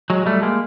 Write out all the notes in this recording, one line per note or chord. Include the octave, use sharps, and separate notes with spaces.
F#3 G#3
G#3
G3 A3
G#3 A#3